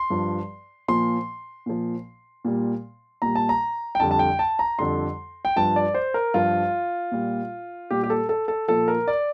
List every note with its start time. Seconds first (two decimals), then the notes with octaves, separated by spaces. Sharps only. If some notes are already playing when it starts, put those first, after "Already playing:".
Already playing: C6
0.10 G2 F3
0.88 A#2 F3 C6
1.66 A#2 F3
2.45 A#2 G3
3.22 A#2 G3 A#5
3.35 A5
3.49 A#5
3.95 G5
4.00 F2 D3 G3 A5
4.11 A5
4.19 G5
4.39 A5
4.59 A#5
4.79 F2 D3 G3 C6
5.45 G5
5.56 G2 F3 A5
5.76 D5
5.94 C5
6.14 A#4
6.34 G2 F3 F4
7.12 A#2 G3
7.91 A#2 G3 G4
8.03 G4
8.10 A4
8.29 A4
8.48 A4
8.68 A#2 F3 A4
8.88 A#4
9.08 D5